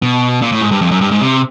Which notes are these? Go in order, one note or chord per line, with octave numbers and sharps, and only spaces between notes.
B2
A#2
A2
G#2
G2
F2
F#2
G2
G#2
C3